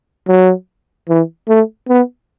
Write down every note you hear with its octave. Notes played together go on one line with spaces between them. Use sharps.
F#3
E3
A3
B3